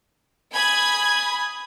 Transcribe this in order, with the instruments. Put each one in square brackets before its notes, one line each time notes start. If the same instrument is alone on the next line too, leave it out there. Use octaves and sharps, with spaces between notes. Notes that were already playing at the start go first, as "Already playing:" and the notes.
[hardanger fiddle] G#5 D#6 [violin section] B5 G#6